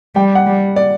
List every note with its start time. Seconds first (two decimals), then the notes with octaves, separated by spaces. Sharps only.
0.15 G3 G5
0.35 F#5
0.46 G3
0.76 D5